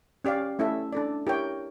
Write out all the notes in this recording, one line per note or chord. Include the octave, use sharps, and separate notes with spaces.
C#4 G4 D5 F5
A3 C#4 E4 A4 E5
D4 A4 D5
E4 G4 A#4 C#5 G5